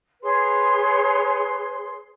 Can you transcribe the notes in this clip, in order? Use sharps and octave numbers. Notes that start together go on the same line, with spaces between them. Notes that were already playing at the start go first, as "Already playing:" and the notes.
G#4 B4 C#5 C6